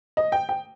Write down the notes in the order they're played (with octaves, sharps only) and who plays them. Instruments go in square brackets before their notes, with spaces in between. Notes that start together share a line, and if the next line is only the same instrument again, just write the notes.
[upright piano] D#5
G5
G5